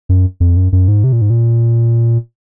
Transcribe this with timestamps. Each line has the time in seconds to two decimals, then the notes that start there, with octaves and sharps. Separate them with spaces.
0.09 F#2
0.40 F2
0.57 F#2
0.72 F#2
0.88 G#2
1.04 C3
1.13 A#2
1.21 G#2
1.30 A#2